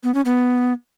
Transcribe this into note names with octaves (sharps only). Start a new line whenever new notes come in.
B3
C#4
B3